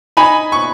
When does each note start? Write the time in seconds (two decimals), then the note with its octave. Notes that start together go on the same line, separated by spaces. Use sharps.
0.17 D#4 G#5 B5
0.52 C#6